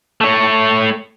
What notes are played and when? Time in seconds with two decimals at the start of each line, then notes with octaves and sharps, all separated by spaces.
0.21 A3 C#5